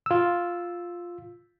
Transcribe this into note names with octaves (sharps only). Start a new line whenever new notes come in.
F4 E6